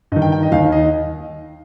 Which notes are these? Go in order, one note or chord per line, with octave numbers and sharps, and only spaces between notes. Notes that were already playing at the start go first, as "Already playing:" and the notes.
G2 D#3 D#5
G5
G5
D#5
D#2 D#3 F5
D#5